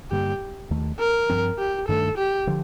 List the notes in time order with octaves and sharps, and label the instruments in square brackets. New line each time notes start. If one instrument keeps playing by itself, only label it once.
[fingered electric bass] G2 D3 G3 A#3 [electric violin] G4
[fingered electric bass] D#2 D#3 A3
[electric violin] A#4
[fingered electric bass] G2 F3 C4
[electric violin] G4
[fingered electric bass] G2 D#3 A3 D4 [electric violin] A4
[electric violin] G4
[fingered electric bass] D3 F3